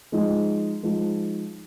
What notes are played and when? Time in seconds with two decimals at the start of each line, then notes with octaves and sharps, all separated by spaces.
0.12 F3 G#3 D#4
0.83 F3 G#3 D#4